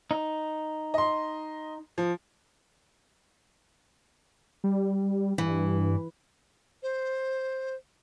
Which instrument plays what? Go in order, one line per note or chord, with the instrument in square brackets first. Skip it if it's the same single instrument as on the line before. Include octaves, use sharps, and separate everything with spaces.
[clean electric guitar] D#4
[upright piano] D#5 C6
F3
[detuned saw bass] G3
[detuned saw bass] G2 [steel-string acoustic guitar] E3
[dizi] C5